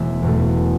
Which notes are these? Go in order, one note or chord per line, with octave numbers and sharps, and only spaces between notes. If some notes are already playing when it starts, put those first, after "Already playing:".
Already playing: E1 A3 E5
E2 B2 A3